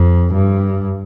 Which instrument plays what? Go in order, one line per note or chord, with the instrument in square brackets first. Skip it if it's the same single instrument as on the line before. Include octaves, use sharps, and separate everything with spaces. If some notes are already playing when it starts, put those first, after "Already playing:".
Already playing: [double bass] F2
G2